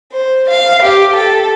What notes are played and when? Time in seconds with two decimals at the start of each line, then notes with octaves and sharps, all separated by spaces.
0.13 C5
0.50 F5
0.84 G4
1.16 A4